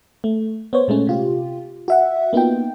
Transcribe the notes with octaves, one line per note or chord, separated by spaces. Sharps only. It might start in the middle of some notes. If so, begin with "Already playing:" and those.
A3
B3 C5 C#5
A#2 G#3 A3 C#4
C3 F4 G4
F#4 E5 F#5
A#3 B3 D#4 F4 G5